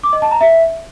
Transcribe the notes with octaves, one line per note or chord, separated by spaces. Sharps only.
D6
D#5
A5
A#5
E5